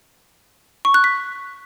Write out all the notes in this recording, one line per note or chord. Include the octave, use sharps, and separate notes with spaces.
C#6
F#6
B6